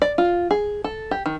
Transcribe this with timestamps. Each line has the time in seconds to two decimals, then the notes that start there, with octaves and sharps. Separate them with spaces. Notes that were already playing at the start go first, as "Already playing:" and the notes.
0.02 D5
0.18 F4
0.51 G#4
0.84 A4
1.11 G4
1.26 D#3